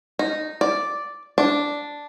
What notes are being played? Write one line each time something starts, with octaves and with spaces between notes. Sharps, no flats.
D#4
D5
D4